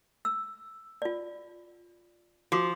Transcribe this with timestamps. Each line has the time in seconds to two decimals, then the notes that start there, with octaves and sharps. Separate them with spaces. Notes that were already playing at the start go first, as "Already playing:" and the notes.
0.25 E6
1.02 F4 D5
2.52 F3 F#4 D6